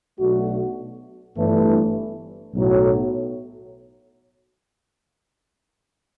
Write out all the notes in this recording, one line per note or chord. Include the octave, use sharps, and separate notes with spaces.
B1 B2 A3 D4 F#4
G1 G2 E3 A3
B1 A2 F#3